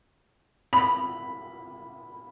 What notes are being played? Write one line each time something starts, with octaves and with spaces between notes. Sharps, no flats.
B5